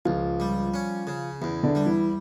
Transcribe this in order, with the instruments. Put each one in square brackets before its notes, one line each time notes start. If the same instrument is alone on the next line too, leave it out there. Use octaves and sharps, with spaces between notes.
[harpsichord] C#2 [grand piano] F3 F4
[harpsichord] G3
C#4
C#3
[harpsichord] E2 [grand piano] E3 E4
[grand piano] D3 D4
[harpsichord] G3
[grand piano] E3 E4